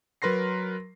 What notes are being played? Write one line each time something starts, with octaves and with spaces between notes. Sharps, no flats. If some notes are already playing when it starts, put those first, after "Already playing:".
F#3 A#4 B4 C6 A#6 C7